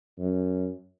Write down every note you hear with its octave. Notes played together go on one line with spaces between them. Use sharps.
F#2